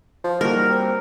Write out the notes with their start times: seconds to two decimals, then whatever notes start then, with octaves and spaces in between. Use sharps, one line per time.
0.24 F3
0.41 D#3 G3 A#3 F#4 A#4
0.70 C4